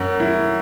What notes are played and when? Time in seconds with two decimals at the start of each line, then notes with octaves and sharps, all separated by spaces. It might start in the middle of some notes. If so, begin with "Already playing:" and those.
Already playing: F#2
0.20 E4